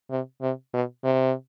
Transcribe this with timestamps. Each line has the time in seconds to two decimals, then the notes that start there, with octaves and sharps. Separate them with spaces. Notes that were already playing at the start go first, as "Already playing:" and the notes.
0.10 C3
0.41 C3
0.74 B2
1.04 C3